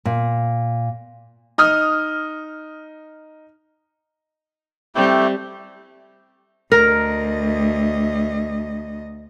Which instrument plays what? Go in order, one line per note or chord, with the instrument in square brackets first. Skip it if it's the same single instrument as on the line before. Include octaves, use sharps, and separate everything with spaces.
[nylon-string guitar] A#2
[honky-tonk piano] D#4 D#6 F6
[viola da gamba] G3 C4 [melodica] A3 E4 G4
[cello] D2 D#5 [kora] A#4